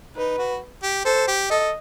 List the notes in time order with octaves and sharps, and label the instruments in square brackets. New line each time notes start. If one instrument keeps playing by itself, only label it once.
[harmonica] D#4 [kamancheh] B4
[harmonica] F#4
G4
[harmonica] A4 [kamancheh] C5
[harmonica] G4
[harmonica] A4 [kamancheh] D#5